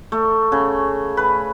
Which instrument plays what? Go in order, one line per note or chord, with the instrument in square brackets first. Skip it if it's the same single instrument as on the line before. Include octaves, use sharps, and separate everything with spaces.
[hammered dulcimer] A3
C#3
B4